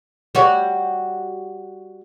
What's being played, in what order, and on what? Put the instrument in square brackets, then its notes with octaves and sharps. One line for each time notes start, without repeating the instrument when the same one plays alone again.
[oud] G3 F#4 C#5